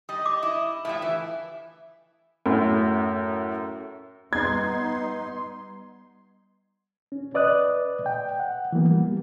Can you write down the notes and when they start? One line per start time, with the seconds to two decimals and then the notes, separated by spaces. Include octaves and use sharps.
0.09 G3 D#5
0.26 D6
0.43 E4
0.85 A2 F3 G3 E5
1.02 E3
2.46 F#2 A2
4.33 G3 B3 D#4 C6 G#6
7.12 C#4
7.34 B4 D5 D#5 D#6 F#6
8.06 G5
8.40 F#5
8.72 E3 F#3 A#3 B3
8.91 G3